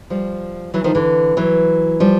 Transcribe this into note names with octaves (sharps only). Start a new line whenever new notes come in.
F3 G3
E3 F#3
D#3 F3
D3 E3
E3 F#3
F3 G3